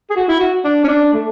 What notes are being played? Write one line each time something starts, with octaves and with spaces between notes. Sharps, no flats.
G#4
F#4
E4
F#4
D4
C#4
D4
A3